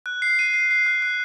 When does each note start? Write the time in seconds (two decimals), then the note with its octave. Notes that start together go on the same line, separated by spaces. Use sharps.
0.06 F#6
0.22 C7
0.39 D#7
0.54 C7
0.71 C7
0.86 F#6
1.02 F#6